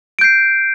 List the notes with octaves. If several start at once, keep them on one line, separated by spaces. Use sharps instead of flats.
G6 C7 D7